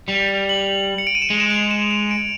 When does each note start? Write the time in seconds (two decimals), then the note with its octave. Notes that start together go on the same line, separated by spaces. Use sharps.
0.08 G3 F7
0.29 F7
0.49 F#7
0.98 C#7
1.07 D7
1.15 D#7
1.22 E7
1.30 G#3 F7
1.40 E7
1.50 F7
1.71 E7
1.91 E7
2.11 D7